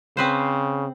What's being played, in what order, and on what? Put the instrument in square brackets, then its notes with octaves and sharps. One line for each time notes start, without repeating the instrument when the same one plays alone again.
[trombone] C#3 [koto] C4 B4 C5